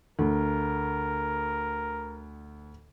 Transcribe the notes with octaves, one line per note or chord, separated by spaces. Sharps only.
D2 A#4